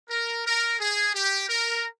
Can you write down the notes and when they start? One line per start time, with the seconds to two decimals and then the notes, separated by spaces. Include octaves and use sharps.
0.10 A#4
0.46 A#4
0.79 G#4
1.15 G4
1.49 A#4